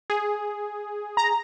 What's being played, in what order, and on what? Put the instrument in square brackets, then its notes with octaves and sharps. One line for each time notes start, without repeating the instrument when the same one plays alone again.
[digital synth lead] G#4
[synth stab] A#5